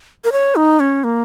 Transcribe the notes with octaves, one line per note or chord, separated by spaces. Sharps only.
A#4
C#5
D#4
C#4
A#3